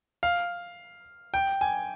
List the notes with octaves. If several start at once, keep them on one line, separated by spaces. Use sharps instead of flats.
F5
G5
G#5